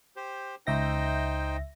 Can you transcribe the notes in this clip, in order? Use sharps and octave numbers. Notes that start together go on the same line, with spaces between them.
G4 C5
C#2 D#4 C5 E5 G5 A#6